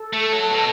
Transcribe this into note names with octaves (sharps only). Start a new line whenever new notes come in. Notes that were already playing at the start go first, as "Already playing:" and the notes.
Already playing: A4
A3 A5
F#3
B2 A4